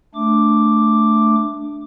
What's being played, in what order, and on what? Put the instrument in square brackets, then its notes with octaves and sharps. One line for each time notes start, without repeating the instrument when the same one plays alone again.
[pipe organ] A3 D4 D6